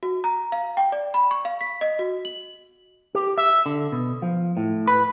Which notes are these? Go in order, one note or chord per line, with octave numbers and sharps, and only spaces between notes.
F#4
A#5
F5
G5
D5
B5
C#6
F5
B6
D#5
F#4
F#7
G4
E5
D3
B2
F3
A2
B4